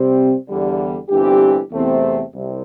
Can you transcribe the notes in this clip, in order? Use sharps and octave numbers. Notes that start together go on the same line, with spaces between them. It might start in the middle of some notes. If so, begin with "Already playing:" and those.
Already playing: C3 G3 C4
E2 D3 G3
G1 G2 E3 C4 G4
E2 C3 A3 C4
C2 C3